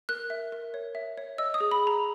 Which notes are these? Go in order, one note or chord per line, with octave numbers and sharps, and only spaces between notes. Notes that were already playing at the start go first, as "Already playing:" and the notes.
A#4 F#6
E5
A#4
C#5
E5
C#5
D#5 E6
D#6
G#4
B5
G#4 A#5